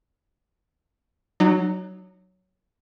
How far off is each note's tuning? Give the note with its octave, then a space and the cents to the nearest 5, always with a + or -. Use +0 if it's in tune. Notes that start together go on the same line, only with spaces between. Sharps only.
F#3 +5 D#4 -40